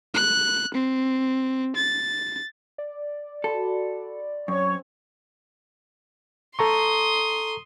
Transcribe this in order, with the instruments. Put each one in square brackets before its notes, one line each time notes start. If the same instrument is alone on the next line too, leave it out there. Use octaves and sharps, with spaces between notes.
[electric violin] F#6
C4
A6
[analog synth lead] D5
[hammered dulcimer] F#4 B5 C6 [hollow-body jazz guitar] A4
[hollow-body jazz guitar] F#2 [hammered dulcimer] C4 C#4 [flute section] C#5 C#6
[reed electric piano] A4 A#5 C#6 [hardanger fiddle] C6 D#6